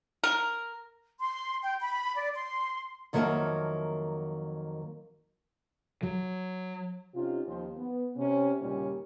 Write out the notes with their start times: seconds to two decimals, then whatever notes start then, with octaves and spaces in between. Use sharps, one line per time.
0.24 A#4
1.19 C6
1.63 G5
1.80 B5
2.15 D5
2.35 C6
3.13 F2 D#3 F#3 A#3 E5 A5
6.03 F#3
7.15 C3 C#4 D#4 F4
7.46 D#2 F3 C5
7.77 B3
8.17 C3 C#4
8.60 D#2 A#2 C#3 G3 C#4 A#4